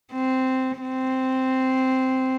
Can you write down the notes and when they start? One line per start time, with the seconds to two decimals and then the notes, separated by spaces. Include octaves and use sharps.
0.12 C4
0.81 C4